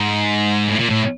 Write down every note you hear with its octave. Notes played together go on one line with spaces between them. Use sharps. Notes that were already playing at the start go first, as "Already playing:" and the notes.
Already playing: G#2
A2
A#2
A2